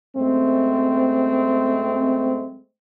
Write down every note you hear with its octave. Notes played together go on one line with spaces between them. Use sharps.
F#2 G#3 A3 C4